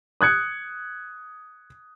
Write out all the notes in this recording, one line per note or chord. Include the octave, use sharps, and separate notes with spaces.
D#6 F#6 G#6 C#7